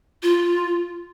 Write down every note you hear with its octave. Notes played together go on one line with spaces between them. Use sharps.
F4